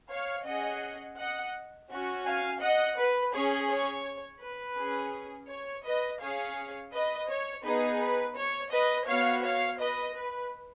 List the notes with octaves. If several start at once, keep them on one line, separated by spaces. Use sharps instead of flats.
C#5 F5
C#4 G#4 D#5 F#5
D#5 F#5
C#4 F#4
F5 G#5
D#5 F#5
B4
C#4 G#4 C#5
C#5
B4
C#4 G#4
C#5
B4 D#5
C#4 G#4 C#5 F5
B4 D#5
C#5
B3 D#4 G#4 B4
B4
C#5
B4 D#5
B3 F#4 C#5 F5
C#5 F5
B4 D#5
B4